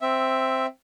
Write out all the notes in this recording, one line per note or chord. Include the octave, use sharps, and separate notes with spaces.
C4 E5